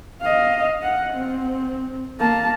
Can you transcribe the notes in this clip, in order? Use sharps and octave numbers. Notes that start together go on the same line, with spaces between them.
D#5 F5
F#5
C4
A#3 A5